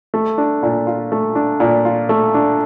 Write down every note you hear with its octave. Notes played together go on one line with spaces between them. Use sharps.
A3
D4
A#2
F4
A3
D4
A#2
F4
A3
D4